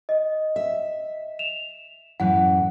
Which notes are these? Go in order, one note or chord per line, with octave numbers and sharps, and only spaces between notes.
D#5
E5
E7 F7
F#2 A2 E3 F#5